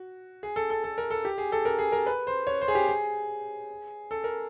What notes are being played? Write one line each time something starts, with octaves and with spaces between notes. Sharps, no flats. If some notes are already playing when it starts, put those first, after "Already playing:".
Already playing: F#4
G#4
A4
A4
A4
A#4
A4
G4
G#4
A4
A#4
G#4
A#4
B4
C5
C#5
C5
G#4
G4
G#4
A4
A#4